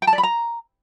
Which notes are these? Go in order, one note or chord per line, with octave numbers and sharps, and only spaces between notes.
G5
A5
D5
B5
A#5